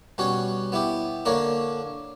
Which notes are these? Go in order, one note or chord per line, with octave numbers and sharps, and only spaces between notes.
B2 G3 C#4 F#4 C#5
B3 E4 G4
D3 A#3 D4 A#4 C#5